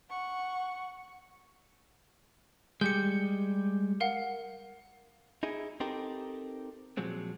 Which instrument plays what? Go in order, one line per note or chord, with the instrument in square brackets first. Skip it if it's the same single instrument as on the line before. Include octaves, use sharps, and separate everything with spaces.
[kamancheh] F#5 C#6
[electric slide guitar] G3 G#3 [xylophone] G6 C#7
[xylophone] A#4 F5 F#5
[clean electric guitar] D#4 E4 G#4
C4 D#4 G4 A4 A#4
A#2 F3 F#3 G#3 C4